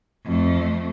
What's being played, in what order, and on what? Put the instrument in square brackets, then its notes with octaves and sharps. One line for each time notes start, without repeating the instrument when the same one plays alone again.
[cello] F2 A3